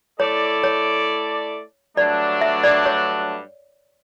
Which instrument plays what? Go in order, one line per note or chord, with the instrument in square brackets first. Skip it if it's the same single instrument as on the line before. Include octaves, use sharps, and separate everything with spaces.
[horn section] A3 E4 A4 D5 [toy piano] C#5
[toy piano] C#5
[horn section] G2 F#3 A3 D4 [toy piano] D5
[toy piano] E5
D5
C#5